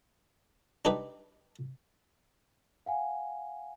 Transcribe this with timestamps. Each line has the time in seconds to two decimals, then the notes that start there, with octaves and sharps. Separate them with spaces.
0.85 D4 D#4 G4 B4
2.86 F5 F#5 G#5